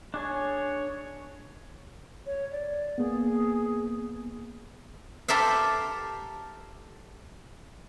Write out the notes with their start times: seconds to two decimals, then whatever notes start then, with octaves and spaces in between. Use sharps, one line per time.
0.14 D4 G#4 C#5 G#5
2.26 C#5
2.52 D5
2.98 A#3 B3 G#4
5.28 G4 A4 A#4 C5 E5 F5